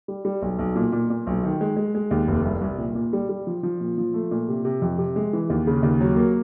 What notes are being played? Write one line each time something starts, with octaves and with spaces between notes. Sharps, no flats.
G3
G3
B1
B1
A#2
A#2
A#2
B1
D#3
G#3
G#3
G#3
D#2
F1
C2
C2
A#2
A#2
G3
G3
F3
F3
A#2
F3
A3
A#2
C3
C3
F2
C3
G#3
E3
D#2
C#3
D#2
F#3
A#3